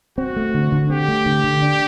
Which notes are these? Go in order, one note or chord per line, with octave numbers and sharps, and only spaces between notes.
C4 F#4
A3
D3
D3
C4 G4
A3
D3
D3
D4